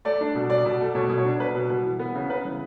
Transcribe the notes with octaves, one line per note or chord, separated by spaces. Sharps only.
A3 D5
D4
B2
B2 D5
B2
A3
B2 C#5
B2
C#5
D4
B2 B4
B2
B2
E3
B3
C#3
C#3 B4
E3